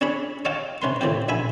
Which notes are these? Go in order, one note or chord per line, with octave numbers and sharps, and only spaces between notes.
C#4 D4 G#4 C#5 B5
C#5 D#5 F5 G5 A5 D6
C3 C#4 B4 C6
A2 C#3 E3 C4 G4
A#1 E5 G#5 B5